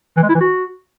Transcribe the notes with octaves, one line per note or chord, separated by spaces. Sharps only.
E3
G#3
E4
E3
F#4